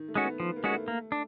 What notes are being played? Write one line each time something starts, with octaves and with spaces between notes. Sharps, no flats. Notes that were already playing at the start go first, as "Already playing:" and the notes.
Already playing: D#3
A3
G#3 C#4 F#4
B3
F3 B3
A#3
G#3 C#4 F#4
A3
A3 A#3
D4